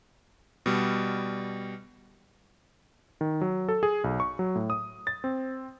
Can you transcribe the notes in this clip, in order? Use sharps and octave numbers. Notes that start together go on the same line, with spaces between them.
B2 G3
D#3
F#3
A4
G#4
B1
C#6
F#3
A2
D#6
A6
C4